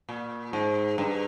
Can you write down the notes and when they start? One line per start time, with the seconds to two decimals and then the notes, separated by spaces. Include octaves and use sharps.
0.09 A#2
0.53 G#2
0.98 G2